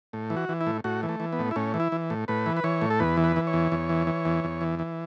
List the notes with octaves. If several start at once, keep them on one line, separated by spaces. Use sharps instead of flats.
A2
E3
F#4
E3
E4
A2
A2 F#4
E3
A3
E3
B3
A2
E4
A2 C#4
E3
E4
E3
A2
A2 B4
E3
B4
E3 C#5
A2
A4
E2 B4
E3
B4
E3
C#5
E2
E2
E3
E3
E2
E2
E3
E3